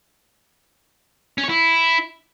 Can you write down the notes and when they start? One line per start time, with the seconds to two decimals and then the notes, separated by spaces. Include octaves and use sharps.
1.38 C#4
1.44 C#5
1.49 E4